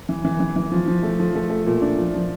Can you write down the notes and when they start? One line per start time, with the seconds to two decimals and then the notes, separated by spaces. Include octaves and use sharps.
0.09 E3
0.25 E3
0.40 E3
0.56 E3
0.72 F3
0.88 F3
1.03 A3
1.20 F3
1.35 A3
1.50 A3
1.66 A#2
1.82 D4
1.98 F3
2.14 F3